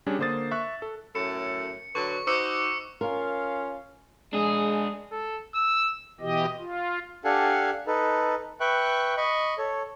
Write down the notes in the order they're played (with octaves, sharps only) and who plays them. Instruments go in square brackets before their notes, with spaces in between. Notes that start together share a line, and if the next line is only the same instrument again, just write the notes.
[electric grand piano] G3 C#4 D4 G#4
D3 A#3 C5 D#6 A6
E5 C#6 F#6
A4
[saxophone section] F#2 A2 A4 [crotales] C#7
[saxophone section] D3 F#3 B4 [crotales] C#6
[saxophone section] D#4 F#4 C5 [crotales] D6 E6 C#7
[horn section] C#4 F4 F5 [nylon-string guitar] A#4
[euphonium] G#3 [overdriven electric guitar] D4 G#4
[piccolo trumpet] A4
E6
[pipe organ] B2 E3 G4 D#5
F4
[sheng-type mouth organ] D4 G4 A4 F5 F#5 G#5
D#4 A4 B4
B4 E5 G5 C#6 F#6
D#5 B5 C#6
A4 C#5